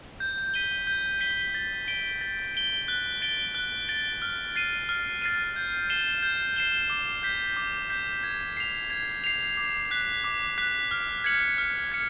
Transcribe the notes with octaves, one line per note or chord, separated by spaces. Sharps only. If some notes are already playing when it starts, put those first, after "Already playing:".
G6
B6 D#7 G7
G6
B6 D#7 G7
A6
D7 G7
A6
D7 G7
F#6
A6 D7 G7
F#6
A6 D7 G7
F6
A6 C7 D#7
F6
A6 C7 D#7
G6
C7 E7 G7
G6
C7 E7 G7
D6
G6 B6
D6
G6 B6
G#6
C7 F7
G#6
C7 F7
D6
F#6 B6
D6
F#6 B6
F6
G#6 C#7 F#7
F6
G#6 C#7